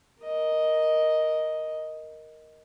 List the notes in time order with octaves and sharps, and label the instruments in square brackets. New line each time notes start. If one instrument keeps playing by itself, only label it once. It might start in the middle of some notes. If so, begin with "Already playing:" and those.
[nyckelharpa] A#4 D#5